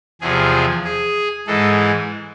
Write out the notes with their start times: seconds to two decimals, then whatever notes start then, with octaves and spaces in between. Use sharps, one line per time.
0.21 E2 C3 F3 G#4
0.84 G#4
1.47 G#2 E3 G#3 A4